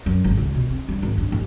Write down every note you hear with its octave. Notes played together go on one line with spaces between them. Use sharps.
F#2
G#1
C#2
B2
C4
G2
G#1
G2
A1